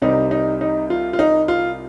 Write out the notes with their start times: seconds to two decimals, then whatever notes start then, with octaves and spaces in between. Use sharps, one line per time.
0.02 C2 C3 G3 C4 D#4
0.31 D#4
0.61 D#4
0.90 F4
1.13 F4
1.19 D#4
1.48 F4